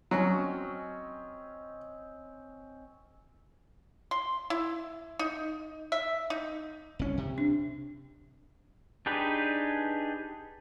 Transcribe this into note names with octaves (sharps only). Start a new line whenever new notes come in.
F#3 C4 C#4 D#5
C6
E4
D#4
E5
D#4
C2 C#4
C3
D4
D4 D#4 G4 G#4 B4